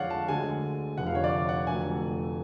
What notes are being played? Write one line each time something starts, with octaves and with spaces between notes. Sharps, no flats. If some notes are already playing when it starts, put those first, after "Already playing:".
Already playing: F2 D3 G#3 C#5 D5 F5 F#5
A5
D2 D3 G#3 G#5
F1 F2 D3 F#5
F5
C#5
D5
F5
F#5
F1 F2 D3 F#3 A3 G#5